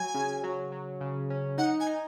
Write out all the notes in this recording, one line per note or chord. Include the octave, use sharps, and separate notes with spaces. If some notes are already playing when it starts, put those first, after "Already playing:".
Already playing: F#3 G#5
C#3
F#3
F#3
C#3
C#4
D#4 F#5
G#5
D#4